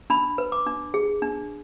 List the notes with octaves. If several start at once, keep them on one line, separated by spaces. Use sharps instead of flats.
D4 B5
B4
D6
D4
G#4
D4